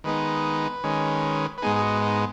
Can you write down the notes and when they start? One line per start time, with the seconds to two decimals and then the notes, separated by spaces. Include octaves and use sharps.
0.04 D#3 G#3 B3 D#4 B4
0.84 D#3 G#3 C#4
1.58 B4
1.62 G#2 G#3 B3 D#4 G#4
1.76 G#4
1.82 F#4
2.02 D#4